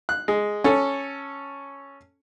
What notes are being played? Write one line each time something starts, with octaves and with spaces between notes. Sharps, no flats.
F#6
G#3
C#4 A4